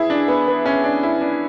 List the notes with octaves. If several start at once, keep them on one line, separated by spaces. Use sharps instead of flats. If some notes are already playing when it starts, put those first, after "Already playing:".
Already playing: E3 E4 G#4
D4
B3
B3
C#4
D4
E4
D4